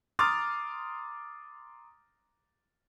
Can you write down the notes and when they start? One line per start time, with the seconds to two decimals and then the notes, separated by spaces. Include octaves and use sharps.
0.19 A#5 C6 D6 D#6 F6 A6